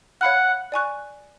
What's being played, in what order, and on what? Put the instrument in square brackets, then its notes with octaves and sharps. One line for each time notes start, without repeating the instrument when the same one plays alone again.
[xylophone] C#5 F5 B5 F6 [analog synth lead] F#5
[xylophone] D5 G#5 C#6 F#6